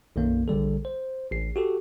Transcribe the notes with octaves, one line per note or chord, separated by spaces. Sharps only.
B1 F#2 D#3 A#3
A#1 D3 G3 A4
C5
A1 C7
F#4 G4 A4